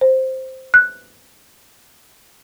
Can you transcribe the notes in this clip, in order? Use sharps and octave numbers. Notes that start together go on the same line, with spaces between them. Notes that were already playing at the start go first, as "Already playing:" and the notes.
C5
F#6